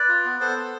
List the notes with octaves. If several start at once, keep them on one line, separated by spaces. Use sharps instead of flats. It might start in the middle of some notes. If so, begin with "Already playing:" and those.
Already playing: B4 D5
F4
B3
B3 A4 C5
B3